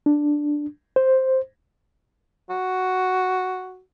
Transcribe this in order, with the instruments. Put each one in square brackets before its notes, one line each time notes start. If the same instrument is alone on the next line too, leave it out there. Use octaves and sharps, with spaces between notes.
[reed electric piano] D4
C5
[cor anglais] F#4